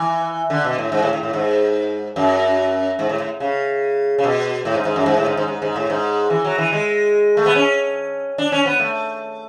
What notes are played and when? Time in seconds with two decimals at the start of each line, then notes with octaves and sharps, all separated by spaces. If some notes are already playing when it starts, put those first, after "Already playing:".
Already playing: E3
0.50 D3
0.64 B2
0.78 A2
0.92 G#2
1.03 A2
1.13 A2
1.23 A2
1.33 G#2
2.16 F#2
2.99 G#2
3.09 A2
3.20 A2
3.40 C#3
4.18 C#3
4.24 B2
4.65 A2
4.75 G#2
4.85 G#2
4.96 F#2
5.06 G#2
5.17 A2
5.26 G#2
5.37 G#2
5.48 G#2
5.62 G#2
5.76 A2
5.90 G#2
6.30 E3
6.44 F#3
6.58 E3
6.73 G#3
7.37 A3
7.46 B3
7.56 C#4
8.38 D4
8.52 C#4
8.66 B3
8.80 A3